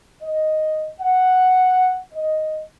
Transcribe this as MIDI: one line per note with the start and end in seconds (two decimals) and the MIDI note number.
0.23 0.87 75
1.01 1.98 78
2.13 2.61 75